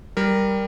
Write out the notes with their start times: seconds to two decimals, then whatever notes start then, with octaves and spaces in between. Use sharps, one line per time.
0.17 G3 A#4